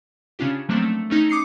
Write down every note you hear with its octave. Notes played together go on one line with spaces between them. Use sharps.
C#3 C#4 D4 F4 G4
F3 F#3 A3 A#3 C4 D4
A3
A3 C#4 D#4
D6 D#6 C7 C#7